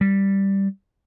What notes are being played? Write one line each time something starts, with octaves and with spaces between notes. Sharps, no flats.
G3